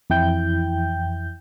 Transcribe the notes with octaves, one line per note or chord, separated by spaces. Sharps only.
F2 E3 E4 G5 G6